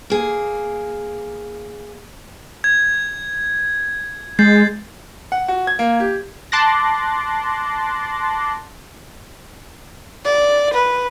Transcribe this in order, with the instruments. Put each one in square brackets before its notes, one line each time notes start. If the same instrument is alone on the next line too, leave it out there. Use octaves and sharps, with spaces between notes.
[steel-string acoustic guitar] A#3 G#4
[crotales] G#6
[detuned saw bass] G#3 [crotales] G6 A6 C7
[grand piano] F#5
F#4
G#6
A#3
G4
[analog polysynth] A5 C6 D6 F#6 A6 A#6
[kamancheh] D5
B4